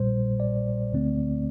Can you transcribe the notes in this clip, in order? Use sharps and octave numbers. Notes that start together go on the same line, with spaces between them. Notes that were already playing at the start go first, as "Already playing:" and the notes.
Already playing: A#1 A#2 G3 C5
D5
D2 D3 A3 C4